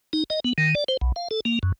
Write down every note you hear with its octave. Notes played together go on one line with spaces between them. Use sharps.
D#4
D#5
B3
D#3
D5
C5
B1
F5
A4
A#3
F#2